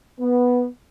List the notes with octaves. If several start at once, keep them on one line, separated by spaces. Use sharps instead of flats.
B3